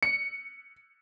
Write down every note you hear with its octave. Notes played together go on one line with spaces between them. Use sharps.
C#7